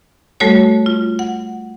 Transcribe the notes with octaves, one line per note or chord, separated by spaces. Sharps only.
G3 A3 F#4 A4 C#5
F4
F#5